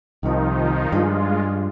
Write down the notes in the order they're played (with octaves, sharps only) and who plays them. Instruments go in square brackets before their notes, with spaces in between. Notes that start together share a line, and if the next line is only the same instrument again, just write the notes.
[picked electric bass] C2 C3 [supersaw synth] D#3 F3 D#4
[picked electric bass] G2 [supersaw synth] G#3 F4